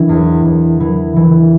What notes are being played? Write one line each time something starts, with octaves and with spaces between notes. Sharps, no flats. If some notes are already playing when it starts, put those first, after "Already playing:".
Already playing: E3 D4
E2
E2
E3
E3